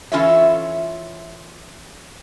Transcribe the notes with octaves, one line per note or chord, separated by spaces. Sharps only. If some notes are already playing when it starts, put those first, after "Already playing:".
E3 C#4 F4 A4 C#5 E5